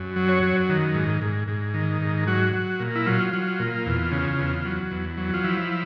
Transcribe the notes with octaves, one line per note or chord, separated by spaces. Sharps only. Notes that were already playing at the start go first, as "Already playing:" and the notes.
Already playing: F#2
F#3
C#5
F#2
D#3
G#2
G#2
G#2
D#3
G#2
F#3 F#4
F#3
A#2
E4
F#3 F4
F#3
A#2
E2
C#3
E2
F#3
E2
F#3
F4
F3 E4